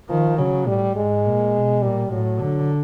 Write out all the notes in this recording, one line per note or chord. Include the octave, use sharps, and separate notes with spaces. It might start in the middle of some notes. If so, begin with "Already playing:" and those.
D#3 F3
C#3 F#3
A2 G3
G#2 G#3
A#2
B2
A#2 G3
A2 F#3
D3